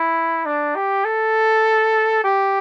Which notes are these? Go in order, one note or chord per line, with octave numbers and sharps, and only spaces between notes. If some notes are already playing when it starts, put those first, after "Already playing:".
Already playing: E4
D4
G4
A4
G4